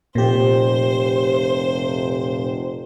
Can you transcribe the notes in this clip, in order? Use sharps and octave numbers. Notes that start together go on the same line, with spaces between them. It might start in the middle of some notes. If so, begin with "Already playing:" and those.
F1 A#2 G4 C5